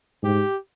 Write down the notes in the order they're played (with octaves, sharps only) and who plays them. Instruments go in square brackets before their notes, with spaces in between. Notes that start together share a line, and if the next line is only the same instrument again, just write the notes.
[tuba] G#2 [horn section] G4